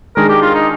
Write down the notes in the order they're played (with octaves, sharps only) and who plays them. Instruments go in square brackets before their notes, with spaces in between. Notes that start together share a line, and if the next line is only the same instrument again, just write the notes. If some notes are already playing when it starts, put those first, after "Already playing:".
[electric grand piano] D#3 G#3 D4 G#4 [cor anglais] A#4
[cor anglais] G4
F4
D#4